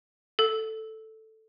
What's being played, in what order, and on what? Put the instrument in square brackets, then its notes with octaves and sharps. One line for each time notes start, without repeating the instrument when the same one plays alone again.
[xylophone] A4